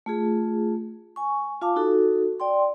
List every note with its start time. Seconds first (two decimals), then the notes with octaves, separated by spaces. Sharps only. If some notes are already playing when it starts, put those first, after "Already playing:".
0.06 A3 F4 G#4
1.16 G#5 C#6
1.62 F4 F5 A5 D6
1.76 D#4 F#4 A4
2.40 D5 G5 C6